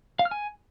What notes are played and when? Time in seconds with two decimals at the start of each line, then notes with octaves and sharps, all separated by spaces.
0.19 F5
0.25 F6
0.31 G#5